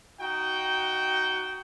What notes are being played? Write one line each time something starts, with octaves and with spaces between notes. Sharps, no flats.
D#4 F#4 G5